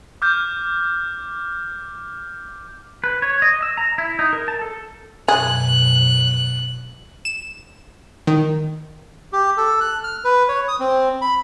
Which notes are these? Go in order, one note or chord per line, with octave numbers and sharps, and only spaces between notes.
D6 F6 G6
B4
C#5
D#5
E6
A#5
E4
D#4
A#4
A5
A4
F#2 B2 G#4 F#6
E7
D#3
G4
A4
F#6
F6
B4
C#5
D#6
C4
B5